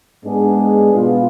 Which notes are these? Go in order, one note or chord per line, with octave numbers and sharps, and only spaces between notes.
G#2 G#3 B3 D4 G#4
B2 B3 F4